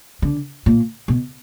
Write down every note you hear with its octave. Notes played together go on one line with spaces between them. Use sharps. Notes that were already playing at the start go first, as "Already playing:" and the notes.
D3
A#2
B2